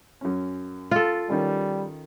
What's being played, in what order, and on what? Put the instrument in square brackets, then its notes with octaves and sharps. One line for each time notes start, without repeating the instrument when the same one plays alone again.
[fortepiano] F#2 C#4
[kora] F4 A4
[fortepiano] D#3 C#4 [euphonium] G3